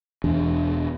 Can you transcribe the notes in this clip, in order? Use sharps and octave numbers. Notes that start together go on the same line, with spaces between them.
E1 E2 D4